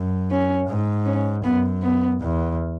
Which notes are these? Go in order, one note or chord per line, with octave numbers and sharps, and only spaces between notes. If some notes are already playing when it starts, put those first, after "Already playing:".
Already playing: F#2
C#4
G#2
C#4
F#2 B3
B3
E2